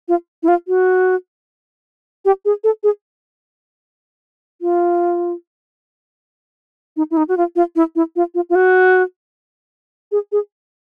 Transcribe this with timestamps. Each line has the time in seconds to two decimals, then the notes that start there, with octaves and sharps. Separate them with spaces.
0.08 F4
0.43 E4
0.48 F4
0.68 F#4
2.25 G4
2.45 G#4
2.64 A4
2.84 G#4
4.62 F4
6.97 D#4
7.11 E4
7.17 D#4
7.29 F#4
7.37 F4
7.56 F4
7.76 E4
7.96 E4
8.16 F4
8.35 F4
8.50 F4
8.55 F#4
10.12 G#4
10.32 G#4